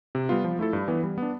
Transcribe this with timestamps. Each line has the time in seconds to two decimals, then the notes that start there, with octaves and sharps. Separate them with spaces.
0.15 C3
0.29 G3 B3 F4
0.44 F3
0.59 A3 E4 A4
0.73 G2
0.88 E3 B3
1.04 G3
1.18 B3 D4